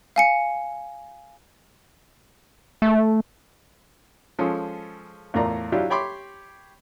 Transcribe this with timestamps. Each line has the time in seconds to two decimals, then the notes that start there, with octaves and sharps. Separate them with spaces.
0.16 F5 G#5 C#7
2.82 A3
4.39 F3 G#3 C#4 G#4 A4
5.34 E2 A2 F4 A#4 D5 A#5
5.72 F#3 D4 E4 F4 G4
5.90 G4 C#5 G5 B5 C6 D6